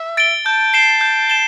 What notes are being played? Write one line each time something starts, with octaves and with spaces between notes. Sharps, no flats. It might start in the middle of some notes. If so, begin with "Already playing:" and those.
Already playing: E5
A6 D7 G7
A5 G6
C7 E7 G7
G6
E7 G7